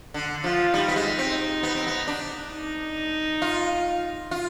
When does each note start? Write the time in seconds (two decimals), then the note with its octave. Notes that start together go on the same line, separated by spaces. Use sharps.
0.14 D3
0.44 F3 F4
0.74 G3 D#4
0.88 B3
0.96 G#3
1.18 C4
1.63 B3
1.75 C4
1.87 B3
2.07 D4
2.53 D#4
3.42 F4
4.31 F4